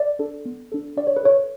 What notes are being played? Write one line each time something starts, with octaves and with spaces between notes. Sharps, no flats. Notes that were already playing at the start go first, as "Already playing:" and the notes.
Already playing: D5
D4 A4
B3
D4 A4
D4 D5
C#5
B4
A4 C#5